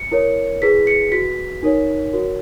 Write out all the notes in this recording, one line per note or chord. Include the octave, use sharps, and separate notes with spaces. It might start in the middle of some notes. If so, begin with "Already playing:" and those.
Already playing: C#7
E4 A#4 C#5
E4 G#4 B4 B6
C#7
F#4 B4 B6
D#4 A#4 C#5
F#4 A#4 C#5